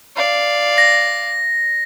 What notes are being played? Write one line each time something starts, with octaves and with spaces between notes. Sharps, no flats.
D5 F5
A#6